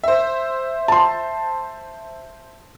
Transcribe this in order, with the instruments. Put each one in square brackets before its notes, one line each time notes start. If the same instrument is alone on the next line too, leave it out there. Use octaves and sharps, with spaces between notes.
[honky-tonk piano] C5 E5
[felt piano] A5 C6